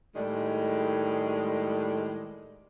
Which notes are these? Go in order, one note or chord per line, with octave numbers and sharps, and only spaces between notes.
A2 D#3 G3 G#3